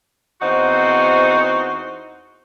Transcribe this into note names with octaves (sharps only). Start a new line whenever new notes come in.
E2 C4 D#4 F#4 C5 F#5